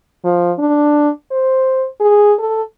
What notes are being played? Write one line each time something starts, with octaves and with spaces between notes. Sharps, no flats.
F3
D4
C5
G#4
A4